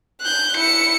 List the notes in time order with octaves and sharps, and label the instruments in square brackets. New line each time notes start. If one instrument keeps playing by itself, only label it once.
[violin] F#6 G6
E4 C#7